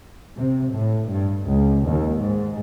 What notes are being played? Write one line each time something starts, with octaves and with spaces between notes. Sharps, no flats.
C3
A2
G2
C#2
D#2
G#2